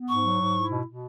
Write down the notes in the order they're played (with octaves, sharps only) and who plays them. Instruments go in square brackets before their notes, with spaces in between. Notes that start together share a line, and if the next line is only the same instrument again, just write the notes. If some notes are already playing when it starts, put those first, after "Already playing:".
Already playing: [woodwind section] B3
[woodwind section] G#2 [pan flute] C#6
[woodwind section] F#3
G#2
E4
B2
B2